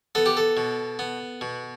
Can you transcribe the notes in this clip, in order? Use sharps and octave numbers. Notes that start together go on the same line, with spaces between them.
B3 A4
G4
A4
B2
B3
B2